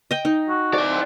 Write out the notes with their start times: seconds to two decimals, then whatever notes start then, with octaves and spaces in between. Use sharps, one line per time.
0.11 D#5 G5
0.25 D#4
0.49 F#4
0.74 E4 D5
0.91 C4